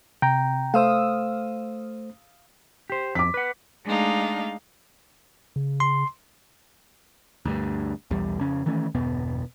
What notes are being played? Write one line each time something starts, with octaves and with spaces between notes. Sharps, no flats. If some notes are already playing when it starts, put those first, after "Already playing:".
C3 G5 A#5
A3 C5 F5 D#6 E6
G4 C5
F2 D6 B6
B4 F#5
G#3 A3 D4 D#4 F5
C#3
C6
D2 G2
B1 E2 G3
F2 C#3 C#4
D#3 E3 A3 C#4
G1 E2 B2 B3